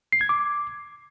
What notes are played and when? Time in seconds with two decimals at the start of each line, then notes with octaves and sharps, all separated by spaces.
0.12 C7
0.21 G#6
0.29 D6